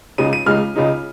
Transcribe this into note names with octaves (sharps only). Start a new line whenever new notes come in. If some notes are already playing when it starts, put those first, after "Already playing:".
C#2 C#3 G#3 D#4 D#7
D#7
C#2 C#3 G#3 D#4 F6
C#2 C#3 G#3 D#4